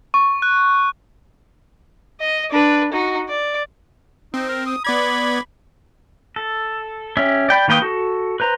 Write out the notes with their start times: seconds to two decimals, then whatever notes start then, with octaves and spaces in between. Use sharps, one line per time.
0.14 C#6
0.42 F#6
2.21 D#5
2.51 D4 B4
2.92 D#4 F#4
3.29 D5
4.34 C4 D#4
4.49 A#4
4.66 D#6
4.85 B3 D5 B5 G#6
6.36 A4
7.17 C#4 G4 E5
7.49 D5 G5 B5
7.68 D#3 A#3 B4 G5 D#6
7.82 F#4 A4
8.40 B4 C5 A#5